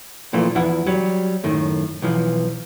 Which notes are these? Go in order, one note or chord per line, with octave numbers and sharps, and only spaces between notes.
A#2 E3 F3 A3
E2 F3 E4 F#5
F#3 G3
F#2 A2 D#3
B1 E3 F3